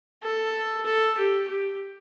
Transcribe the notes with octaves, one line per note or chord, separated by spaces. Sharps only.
A4
A4
G4
G4